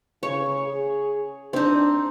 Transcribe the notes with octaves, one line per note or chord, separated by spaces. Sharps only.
C#3 C#5
G#4
C4 D4 D#4